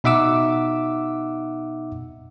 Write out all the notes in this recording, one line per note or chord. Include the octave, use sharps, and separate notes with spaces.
B2 D#4 E5 F#5 D6 E6